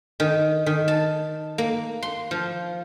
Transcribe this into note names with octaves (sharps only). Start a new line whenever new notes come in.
D#3
D#3
A5
A#3
C6
F3